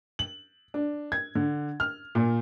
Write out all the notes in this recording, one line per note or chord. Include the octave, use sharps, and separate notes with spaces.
F#7
D4
G#6
D3
F6
A#2